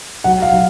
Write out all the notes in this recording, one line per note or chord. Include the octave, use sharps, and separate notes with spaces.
F#3 F#5
F5
F#3